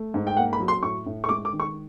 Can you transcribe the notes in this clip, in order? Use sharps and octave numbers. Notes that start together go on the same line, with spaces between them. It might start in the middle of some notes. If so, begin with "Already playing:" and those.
Already playing: A3
G#2
G5
A#3 F#5
B5
F#3
C6
A2 C#6
A2
C#6
G#3 D6
D6
D#3
C#6